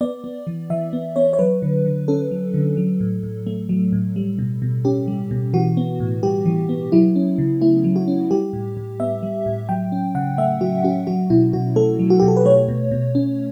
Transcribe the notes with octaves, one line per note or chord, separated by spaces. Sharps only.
B3 D5
B3
E3
E3 E5
B3
B3 C#5
C#5
F#3 B4
D3
D3
C#4 A4
F#3
D3
F#3
A2
A2
A3
F#3
A2
G3
B2
B2
C#4 G4
G3
B2
E3 F#4
B3
A2
G3 G4
E3
B3
F#3 E4
C#4
C#3
A3 E4
F#3
F#4
C#4
G3 G4
A2
A2
B3 E5
G3
A2
F#3 G5
C#4
C#3 F#5
A3 E5
F#3 F#4
C#4 F#4
F#3 F#4
B2 E4
B2 F#4
A3 A4
F#3
F#4
B2 G4
A4
B4
A3 C#5
B2
B2
C#4